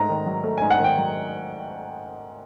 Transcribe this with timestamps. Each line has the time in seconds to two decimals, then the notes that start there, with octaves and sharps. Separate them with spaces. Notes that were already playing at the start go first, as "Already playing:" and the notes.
Already playing: G#2 A3 A#5
0.09 D#3
0.26 F#3
0.44 A3
0.58 G#2 G#5
0.70 F#5
0.79 D#3
0.84 G5
0.97 F#3